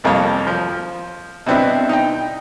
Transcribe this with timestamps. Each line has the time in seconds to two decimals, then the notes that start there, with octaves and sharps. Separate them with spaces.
0.04 C2 F2 A#3 C#5
0.47 F3
1.46 B2 B3 C4 D4 E4
1.89 D#4 G5